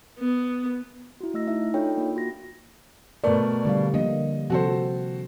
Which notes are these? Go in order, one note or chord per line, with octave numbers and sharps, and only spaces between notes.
B3
E4 F#4
A3 D#5 E6 A#6
D#4 E4 E5
D4 D#4 F4 A4 C#5 G5
A#3 F4
F#4 A#6
B2 A3 A#4 B4 D5
D3 G3 F5
D3 F3 A#3 D#5
C3 F3 C4 F#4 A4 C5